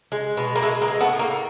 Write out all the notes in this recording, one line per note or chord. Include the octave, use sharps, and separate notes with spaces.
G#3
B2
A#3
G#3 A3
A#3
G#3
A3 B3
A2
A#3